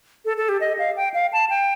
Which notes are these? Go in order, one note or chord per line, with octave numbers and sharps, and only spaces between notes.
A4
A4
G4
D#5
F5
G5
F5
A5
G5